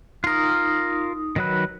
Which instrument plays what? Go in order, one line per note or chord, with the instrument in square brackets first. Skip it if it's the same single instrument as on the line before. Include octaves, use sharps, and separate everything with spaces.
[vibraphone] D#4 D#6 [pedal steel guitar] F4 A#4
[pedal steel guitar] D#3 F#3 B4